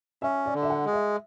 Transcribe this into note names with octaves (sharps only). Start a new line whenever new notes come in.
C#4 E5
D5
D3
E5
F#5
G#3
E5